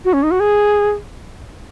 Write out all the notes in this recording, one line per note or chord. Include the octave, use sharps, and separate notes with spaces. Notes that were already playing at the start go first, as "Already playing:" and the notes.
F#4
C#4
D#4
F#4
G#4